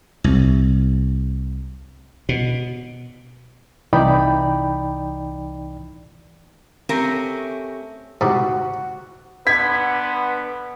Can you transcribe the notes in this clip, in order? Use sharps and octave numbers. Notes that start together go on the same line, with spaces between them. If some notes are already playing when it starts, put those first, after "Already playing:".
C2
B2
C2 E3 D#4 D5 G5 B5
A3 C4 C#4 G4 A#4
G#2 C3 F#4
D3 B3 B4 G#6 B6